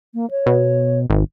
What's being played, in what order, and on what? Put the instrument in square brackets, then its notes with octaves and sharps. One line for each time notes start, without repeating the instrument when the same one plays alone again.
[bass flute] A#3
C#5
[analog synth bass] B2
G#1